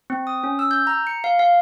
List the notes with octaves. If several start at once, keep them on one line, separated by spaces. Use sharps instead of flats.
C4
D#6
C#4
E6
G6
A#5
C#7
F5
F5